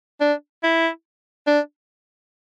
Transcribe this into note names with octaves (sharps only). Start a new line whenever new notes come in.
D4
E4
D4